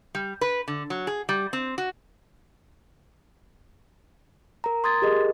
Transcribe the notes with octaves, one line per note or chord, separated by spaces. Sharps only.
G3
B4
D3
F#3
G#4
G3
C4
F#4
A#4 A#5
C6 D#6 G#6 A6
G4 G#4 A#4 D#5